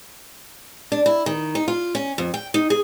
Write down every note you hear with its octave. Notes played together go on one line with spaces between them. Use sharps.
D4
E4
D#3
D#4
F4
C#4
F2
G5
D#4
G#4